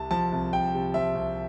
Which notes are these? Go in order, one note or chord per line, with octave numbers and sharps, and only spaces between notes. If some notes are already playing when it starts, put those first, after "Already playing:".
Already playing: C2 C3 A5
F3 A5
C2
C2 G5
C3
F3 E5
C2